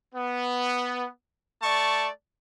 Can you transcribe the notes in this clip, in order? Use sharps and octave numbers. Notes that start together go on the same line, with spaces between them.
B3
A3 D5 A5 C#6